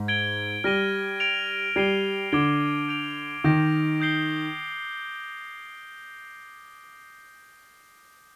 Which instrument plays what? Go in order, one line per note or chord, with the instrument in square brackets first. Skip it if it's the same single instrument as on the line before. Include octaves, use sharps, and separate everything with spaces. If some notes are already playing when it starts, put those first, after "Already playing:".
Already playing: [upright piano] G#2
[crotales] G#6 D7 G7
[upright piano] G3 [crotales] F6 A#6 D#7 G7
[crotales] G#6 D7 F7
[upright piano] G3 [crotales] G#6 C7 D#7 G7
[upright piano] D3 [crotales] D6 G#6 D7 G7
[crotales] G6 D7 F7
[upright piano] D#3 [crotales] D6 G6 A#6 D7
[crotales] D#6 G6 C7 G7